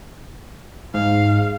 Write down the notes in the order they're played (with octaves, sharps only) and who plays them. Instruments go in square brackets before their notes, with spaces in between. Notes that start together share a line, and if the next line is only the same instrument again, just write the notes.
[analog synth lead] G#2 [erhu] F5